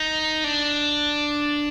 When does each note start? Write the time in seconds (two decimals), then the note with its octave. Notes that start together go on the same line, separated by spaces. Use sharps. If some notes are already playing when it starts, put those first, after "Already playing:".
Already playing: D#4
0.44 D4